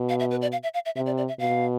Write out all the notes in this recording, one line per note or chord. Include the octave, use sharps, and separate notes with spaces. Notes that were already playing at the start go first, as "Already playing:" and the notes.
Already playing: B2
F5
E5
B4
D5
F5
E5
F5
E5
C3 E5
D5
D5
E5
B2 F5